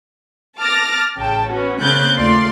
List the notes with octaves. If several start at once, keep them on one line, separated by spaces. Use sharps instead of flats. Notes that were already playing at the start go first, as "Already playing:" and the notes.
A5 D6 F6 A6 A#6
A1 C#3 G5 A5
B3 C#4 F#4
C#3 A#3 C4 F#6 G6 A6
D#2 A3 F4 D5 C6